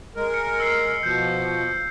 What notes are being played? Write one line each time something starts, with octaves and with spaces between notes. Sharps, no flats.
G#3 A#4
C#7
E6 C7
B2 F3 G6